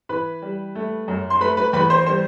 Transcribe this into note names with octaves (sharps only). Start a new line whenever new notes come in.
E3 B4 B5
G3
A3
F#2
C6
A3 B4 B5
B4 B5
E2 B4 B5
C5 C6
G3 C5 C6